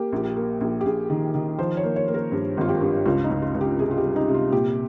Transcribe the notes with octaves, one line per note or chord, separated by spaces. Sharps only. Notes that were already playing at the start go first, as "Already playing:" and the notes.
Already playing: A#3 G4
A#1
A#3
A#1
G4
A#1 G#4
D#3
D#3
F3 C5
C#5
A#3
C#5
A#3
A#4
G2
G#1 F4
G4
G2
C#2 F4
D#4
C#2
F4
C#2
G4
C3 G#4
F4
G4
G3
D#4
C3
F4
A#2 G4